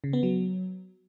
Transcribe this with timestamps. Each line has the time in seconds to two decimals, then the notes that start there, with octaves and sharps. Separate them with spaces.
0.04 C#3
0.13 B3
0.23 F#3